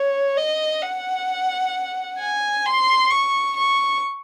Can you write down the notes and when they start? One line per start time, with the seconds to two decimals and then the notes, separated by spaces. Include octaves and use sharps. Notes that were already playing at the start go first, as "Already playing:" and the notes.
Already playing: C#5
0.37 D#5
0.83 F#5
2.19 G#5
2.66 C6
3.10 C#6
3.57 C#6